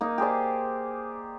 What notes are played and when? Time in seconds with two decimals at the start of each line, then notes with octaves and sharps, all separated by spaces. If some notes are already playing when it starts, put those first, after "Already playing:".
0.01 A#3 D#4
0.18 G4 G#4 C5 D5